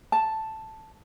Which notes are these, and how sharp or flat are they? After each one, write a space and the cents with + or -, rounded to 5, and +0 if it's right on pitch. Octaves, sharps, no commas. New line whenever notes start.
A5 +0